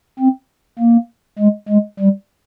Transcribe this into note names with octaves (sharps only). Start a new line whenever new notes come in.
C4
A#3
G#3
G#3
G3